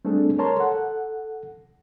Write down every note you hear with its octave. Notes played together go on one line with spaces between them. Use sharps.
G3 A3 C4 D4 G#4 A4
A#4 C#5 A5 A#5 C6
A4 F#5